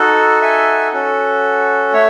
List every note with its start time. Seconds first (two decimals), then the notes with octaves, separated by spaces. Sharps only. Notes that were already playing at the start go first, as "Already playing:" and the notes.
Already playing: D#4 F#4 A4
0.41 E5 G#5
0.93 C#4 F#4 A4
1.93 A3 C#5 E5